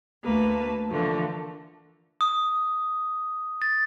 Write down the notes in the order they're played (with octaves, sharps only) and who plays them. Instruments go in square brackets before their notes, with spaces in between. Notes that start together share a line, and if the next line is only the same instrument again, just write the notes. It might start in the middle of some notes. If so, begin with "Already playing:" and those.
[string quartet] D2 A3 A#3 B4 A5
D3 E3 F3 A3 A#3
[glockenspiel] D#6
A6